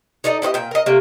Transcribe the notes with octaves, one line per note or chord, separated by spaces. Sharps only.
D#4 A4 D5 D#5
E4 G4 C5 D#5
A#2 G5
A#4 D#5
C3 A3 A#3